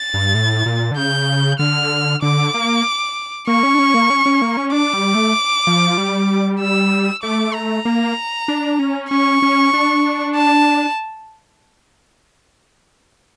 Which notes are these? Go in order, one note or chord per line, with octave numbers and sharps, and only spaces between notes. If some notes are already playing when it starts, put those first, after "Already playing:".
Already playing: A6
G2
A2
A#2
D3
C#3 G6
D3 F6
D3 D6
A#3
A#3 C#6
C#4
D4
C#4
A#3
C#4
C#4
A#3
C#4
D4 D6
G3
A3
F3
G3
E6
A3 D6
A#5
A#3
D4
C#4
C#4 C#6
C#4
D4
A5